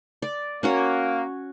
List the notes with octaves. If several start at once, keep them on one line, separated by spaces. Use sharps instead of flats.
D5
A#3 C#4 F#4 C#5